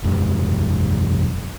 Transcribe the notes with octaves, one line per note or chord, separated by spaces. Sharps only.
E1 F#2 G#3